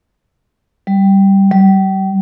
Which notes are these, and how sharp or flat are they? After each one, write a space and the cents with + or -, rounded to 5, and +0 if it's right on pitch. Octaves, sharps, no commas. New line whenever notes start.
G3 -5
G3 -35